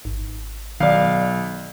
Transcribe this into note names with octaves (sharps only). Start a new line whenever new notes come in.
G#1
B1 D#3 D5 F5